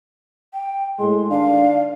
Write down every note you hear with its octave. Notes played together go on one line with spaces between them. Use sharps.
G5
A2 G#3 C6
D#3 D4 F5